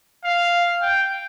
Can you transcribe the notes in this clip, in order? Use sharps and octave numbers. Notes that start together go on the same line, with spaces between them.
F5
G5